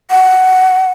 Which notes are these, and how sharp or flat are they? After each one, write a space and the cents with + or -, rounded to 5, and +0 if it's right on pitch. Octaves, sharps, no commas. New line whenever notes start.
F#5 +10